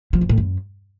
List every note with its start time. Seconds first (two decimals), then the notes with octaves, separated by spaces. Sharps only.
0.13 F3
0.21 F#2
0.29 A2
0.38 F#2